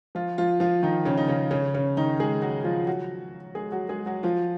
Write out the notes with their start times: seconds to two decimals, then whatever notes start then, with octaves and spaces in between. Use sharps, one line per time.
0.15 F3 F4
0.38 F3 F4
0.60 F3 F4
0.83 D#3 D#4
1.05 C#3 C#4
1.17 D#4
1.28 C#3 C#4
1.51 C#3 C#4
1.74 C#3 C#4
1.97 D#3 D#4
2.20 G#3 G#4
2.42 F#3 F#4
2.64 F3 F4
2.87 F#3 F#4
3.55 G#3 G#4
3.72 F#3 F#4
3.89 G#3 G#4
4.06 F#3 F#4
4.23 F3 F4